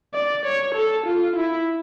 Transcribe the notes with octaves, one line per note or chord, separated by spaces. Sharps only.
D5
C#5
A4
F4
E4